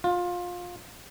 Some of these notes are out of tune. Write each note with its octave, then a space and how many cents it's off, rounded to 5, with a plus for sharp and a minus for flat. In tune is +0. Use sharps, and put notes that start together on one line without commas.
F4 +20